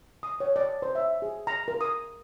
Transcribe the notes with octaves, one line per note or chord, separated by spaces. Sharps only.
D#6
C#5
D5
C5
E5
G#4
A#5
A#4
D#6